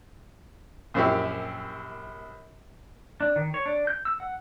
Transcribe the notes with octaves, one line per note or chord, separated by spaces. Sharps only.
A#1 F#2 C4 E4 G4
D4
D#3
C#5
D4
G6
E6
F#5